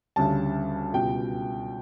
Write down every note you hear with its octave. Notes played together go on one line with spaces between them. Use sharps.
D2 C#3 G3 A5
C#2 B2 G3 G5